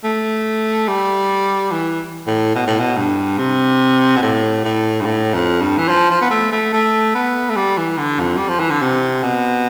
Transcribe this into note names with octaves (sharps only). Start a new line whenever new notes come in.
A3
G3
E3
A2
B2
A2
B2
G2
C3
B2
A2
A2
G2
A2
F2
G2
E3
F3
F3
B3
A3
A3
A3
B3
A3
G3
E3
D3
F2
G3
F3
E3
D3
C3
B2